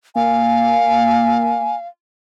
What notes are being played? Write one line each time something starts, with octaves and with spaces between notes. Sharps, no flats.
A#3 F5 G#5